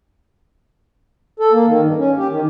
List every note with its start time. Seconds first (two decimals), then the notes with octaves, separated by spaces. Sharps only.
1.40 A4
1.52 A#3
1.66 D#3
1.83 G2
1.98 C#4
2.17 G4
2.29 D#3